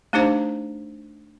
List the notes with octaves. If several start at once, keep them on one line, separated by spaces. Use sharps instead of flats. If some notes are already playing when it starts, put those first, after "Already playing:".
A3 D4 D#4 G4 C5 A#5